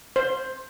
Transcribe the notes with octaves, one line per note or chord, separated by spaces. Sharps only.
C5